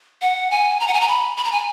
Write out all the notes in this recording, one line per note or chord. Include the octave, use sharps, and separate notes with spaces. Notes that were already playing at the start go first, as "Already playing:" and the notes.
F#5
G#5
A#5
F#5
G#5
A#5
B5
B5
A#5
G#5